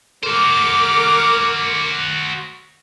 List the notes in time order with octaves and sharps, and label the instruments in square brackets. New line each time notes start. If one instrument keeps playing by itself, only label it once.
[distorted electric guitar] F#4 C5 [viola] A#4 D6